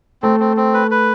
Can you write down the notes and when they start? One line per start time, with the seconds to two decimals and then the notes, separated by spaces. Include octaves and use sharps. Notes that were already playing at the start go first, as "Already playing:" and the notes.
0.22 A3 C4
0.40 C4
0.57 C4
0.74 B4
0.91 B4